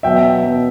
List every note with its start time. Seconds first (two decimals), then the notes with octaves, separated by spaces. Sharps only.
0.03 B2 F#3 B3 E5 G5
0.43 B2 F#3 B3